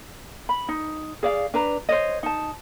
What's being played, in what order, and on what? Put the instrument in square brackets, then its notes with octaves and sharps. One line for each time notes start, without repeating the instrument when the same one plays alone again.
[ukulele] B5
D#4
G#4 D5 F5
D4 B4 A#5
C5 C#5 D#5
D#4 A5